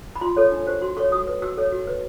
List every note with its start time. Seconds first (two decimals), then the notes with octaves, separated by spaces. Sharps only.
0.16 B5
0.21 F4 C6
0.37 A4 C#5
0.52 D4
0.67 G4 C5
0.82 F#4 C6
0.97 A4 C#5 C#6
1.12 F#4 D#6
1.27 B4
1.42 F#4 E6
1.57 A4 C#5
1.72 F#4
1.87 B4